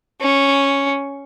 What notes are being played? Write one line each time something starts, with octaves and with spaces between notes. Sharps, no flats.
C#4